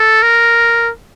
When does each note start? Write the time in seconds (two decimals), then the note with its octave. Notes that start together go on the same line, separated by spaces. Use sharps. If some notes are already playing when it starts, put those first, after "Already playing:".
Already playing: A4
0.22 A#4